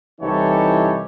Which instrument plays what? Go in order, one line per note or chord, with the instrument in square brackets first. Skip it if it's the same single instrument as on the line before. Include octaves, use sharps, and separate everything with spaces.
[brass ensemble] C2 E3 D#4 G4 A4 C#5